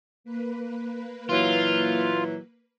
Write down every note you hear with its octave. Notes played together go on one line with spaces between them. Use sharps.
A#3 B4
A#2 E3 F#3 F4